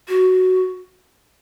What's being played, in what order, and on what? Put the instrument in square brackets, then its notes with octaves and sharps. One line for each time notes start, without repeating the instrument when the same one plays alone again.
[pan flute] F#4